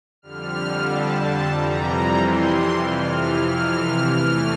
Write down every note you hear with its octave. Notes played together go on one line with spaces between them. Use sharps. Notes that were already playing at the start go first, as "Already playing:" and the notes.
F2 D3 G3 F6
A5
A5
F2 C3 E3 G3 A#5
C6
F2 C3 E3 F6
F6
E2 E3 A3 F6